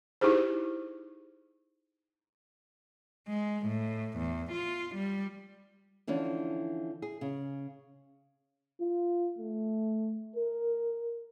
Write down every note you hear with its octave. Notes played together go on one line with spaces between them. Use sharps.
D#4 E4 G4 G#4 C5
G#3
A2
E2
F4
G3
D3 E3 F3 C#4 D4
G#4
C#3
F4
A3
A#4